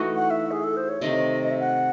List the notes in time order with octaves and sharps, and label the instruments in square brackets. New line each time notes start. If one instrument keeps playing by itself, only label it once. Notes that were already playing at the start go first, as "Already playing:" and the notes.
Already playing: [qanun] E3 A3 D#4 F#4
[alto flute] F#5
E5
G#4
A4
C5
C#5
[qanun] C3 D#3 A3 [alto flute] D#5
[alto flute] D#5
E5
F#5